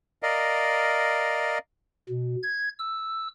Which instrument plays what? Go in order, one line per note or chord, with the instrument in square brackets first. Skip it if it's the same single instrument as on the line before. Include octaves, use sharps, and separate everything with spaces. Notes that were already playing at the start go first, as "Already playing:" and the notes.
[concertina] A#4 D5 D#5 F5
[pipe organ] B2
G#6
E6